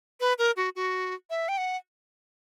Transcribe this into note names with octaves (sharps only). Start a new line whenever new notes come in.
B4
A#4
F#4
F#4
E5
G5
F#5